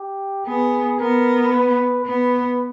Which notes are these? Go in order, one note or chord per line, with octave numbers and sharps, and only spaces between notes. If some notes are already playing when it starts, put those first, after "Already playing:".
Already playing: G4
B3 G#4
B3 A#4
B4
B3 B4